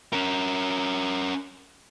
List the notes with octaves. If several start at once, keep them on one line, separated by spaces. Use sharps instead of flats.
C#4 A#4